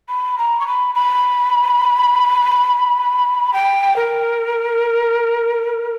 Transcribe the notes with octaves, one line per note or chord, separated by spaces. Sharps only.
B5
A#5
C#6
B5
B5
G5
A#4